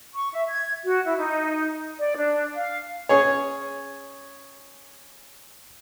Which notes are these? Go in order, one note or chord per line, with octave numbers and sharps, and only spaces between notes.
C#6
E5
G#6
F#4
E4
D#4
D5
D4
F5
C#4 G#4 C#5